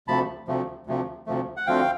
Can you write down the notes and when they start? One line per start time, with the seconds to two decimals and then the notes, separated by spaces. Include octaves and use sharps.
0.08 D2 C3 F3 A3 A5 B5
0.48 D2 C3 F3 A3
0.87 D2 C3 F3 A3
1.26 D2 C3 F3 A3
1.57 F#5
1.67 D2 D3 F3 A3 C4 F5 G5